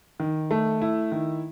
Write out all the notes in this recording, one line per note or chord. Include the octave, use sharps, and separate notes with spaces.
D#3
A3
E4
D#3